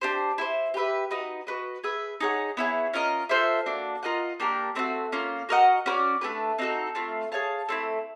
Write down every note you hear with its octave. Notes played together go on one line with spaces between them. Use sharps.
D4 G4 C5
E4 A4 C5
G4 B4 E5
D#4 F#4 B4 D#5
F#4 B4 D#5
G#4 B4 E5
D#4 G#4 C#5 F#5
B3 E4 G#4 C#5
C#4 F4 A#4 D#5
F4 A4 C5 E5
A#3 D4 F#4
F4 A#4 D#5 F#5
A#3 D4 G4 A#4
A3 C4 D#4 F#4
A#3 C#4 F4
F#4 A#4 D#5 F#5
C#4 F#4 B4 D5
A3 D4 G4 B4
C4 D#4 F#4 A4
A3 C4 F4
G#4 C#5 F5 A5
A3 C4 E4